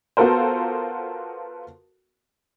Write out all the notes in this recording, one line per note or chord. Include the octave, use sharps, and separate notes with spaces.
B3 F4 F#4 A4 A#4 C5